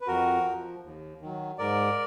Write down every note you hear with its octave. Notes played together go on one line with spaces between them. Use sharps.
B4
F2 F#4 A#4
F3
D#2
D#3 F#3
G#2 A#4 D5